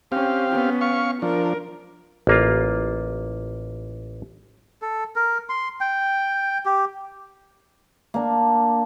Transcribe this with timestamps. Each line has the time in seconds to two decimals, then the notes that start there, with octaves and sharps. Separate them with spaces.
0.12 C4 C#4 G4 F5
0.51 B3 C#4
0.81 F5 C#6
1.22 F3 D4 A#4
2.27 A1 A#3 F4
4.82 A4
5.16 A#4
5.49 C6
5.81 G5
6.66 G4
8.14 A#3 D4